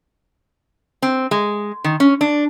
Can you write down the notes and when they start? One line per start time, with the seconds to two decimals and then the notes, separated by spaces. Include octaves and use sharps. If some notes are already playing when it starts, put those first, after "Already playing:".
1.02 C4
1.31 G#3
1.84 D#3
2.00 C#4
2.21 D4